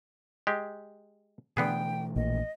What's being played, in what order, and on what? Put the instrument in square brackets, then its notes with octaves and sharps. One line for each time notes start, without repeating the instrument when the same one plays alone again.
[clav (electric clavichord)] G#3 G4
[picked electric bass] B2 E3 A3 [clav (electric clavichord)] D3 B3 G#4 [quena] G5
[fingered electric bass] A#1 [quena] D#5